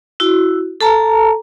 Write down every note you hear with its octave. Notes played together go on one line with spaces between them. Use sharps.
E4 F#4
A4 A5 A#5